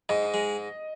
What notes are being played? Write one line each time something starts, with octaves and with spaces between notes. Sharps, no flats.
G#2 D#5
G#3